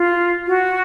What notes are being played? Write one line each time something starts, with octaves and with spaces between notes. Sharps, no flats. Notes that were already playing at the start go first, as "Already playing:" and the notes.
Already playing: F4
F#4